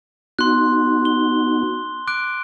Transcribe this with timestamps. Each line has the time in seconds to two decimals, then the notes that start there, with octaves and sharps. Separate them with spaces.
0.39 B3 D#4 F#4 C6 F#6
1.05 G7
2.07 D6 F#6 D7